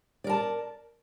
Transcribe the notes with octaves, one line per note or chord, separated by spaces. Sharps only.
A#4 D5 A5